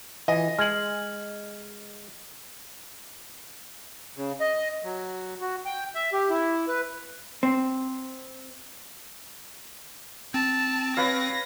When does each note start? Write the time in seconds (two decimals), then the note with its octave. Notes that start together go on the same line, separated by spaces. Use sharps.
0.28 E3 D#5 G#5
0.59 G#3 F6 G#6 F#7
4.17 C#3
4.40 D#5
4.84 F#3
5.41 F#4
5.65 G5
5.95 E5
6.13 G4
6.30 E4
6.68 B4
7.43 C4
10.34 C4 A5
10.97 B4 C#5 F5 A#6